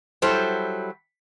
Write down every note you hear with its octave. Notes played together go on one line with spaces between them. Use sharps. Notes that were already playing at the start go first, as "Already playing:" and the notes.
F#3 G3 E4 A4 C5